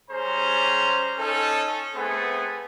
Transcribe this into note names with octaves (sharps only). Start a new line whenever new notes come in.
G3 C#4 G#4 C5 A#5
C#4 D#4 A4
A3 B3 C4 G#4